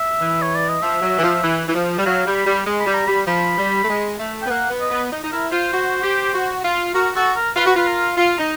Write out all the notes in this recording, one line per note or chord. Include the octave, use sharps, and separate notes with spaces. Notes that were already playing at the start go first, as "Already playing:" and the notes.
Already playing: E5
E3
C#5
D5
D#5
F3 E5
F#3
E3
F3
E3
E3
F3
G3
F#3 F5
G3
B5
G3
G#3
B5
G3
A#5
G3 B5
F3 B5
G3
A3
G#3
A3
G5
B3
A#3 F#5
B3
D#5
B3
D#4
D#4
E4 A#4
F4 C5
F#4
G4
F#4
F4
F#4 A#4
F#4 A4
A#4
F4 B4
F#4
F4 B4
A#4
F4
D#4